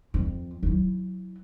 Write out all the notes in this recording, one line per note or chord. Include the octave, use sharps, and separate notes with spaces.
F2
F#3 E4